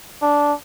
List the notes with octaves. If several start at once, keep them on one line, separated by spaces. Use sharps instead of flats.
D4